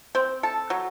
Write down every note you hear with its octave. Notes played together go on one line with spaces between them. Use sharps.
C4
A4
F#3